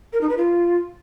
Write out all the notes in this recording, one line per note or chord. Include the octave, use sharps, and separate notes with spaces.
A#4
D#4
B4
F4